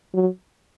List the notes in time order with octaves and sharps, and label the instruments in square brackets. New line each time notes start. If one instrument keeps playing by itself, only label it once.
[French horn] F#3